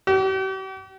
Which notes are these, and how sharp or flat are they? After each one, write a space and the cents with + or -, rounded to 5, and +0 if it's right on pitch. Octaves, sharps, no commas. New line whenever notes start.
G4 -45